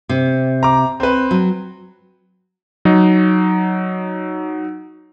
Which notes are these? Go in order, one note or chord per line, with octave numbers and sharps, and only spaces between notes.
C3
A#5 D6
C4 B4
F#3
F#3 D#4